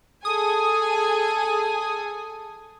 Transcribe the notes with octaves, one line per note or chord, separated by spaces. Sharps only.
G#4 A4 G#5 D#6